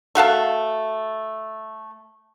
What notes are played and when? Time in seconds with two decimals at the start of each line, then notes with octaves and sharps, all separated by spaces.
0.15 A3 F#4 F5 A5